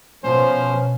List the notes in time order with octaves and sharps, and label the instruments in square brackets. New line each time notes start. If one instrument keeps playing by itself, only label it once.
[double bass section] B2 [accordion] F3 [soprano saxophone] C#4 [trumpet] C5